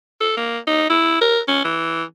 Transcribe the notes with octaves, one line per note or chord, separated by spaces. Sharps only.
A4
A#3
D#4
E4
A#4
C#4
E3